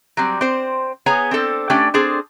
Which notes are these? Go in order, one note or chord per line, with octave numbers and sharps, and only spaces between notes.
F#3 G3 C4
C4 C5
B3 G#4 C#5 G#5 A#5
C4 D4 A4 C5
A3 C#4 D4 G4 D5 G5
C4 D4 G#4 A4 C5